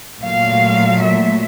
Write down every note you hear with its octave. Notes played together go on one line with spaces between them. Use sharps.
A#2 F#3 A3 F5
E5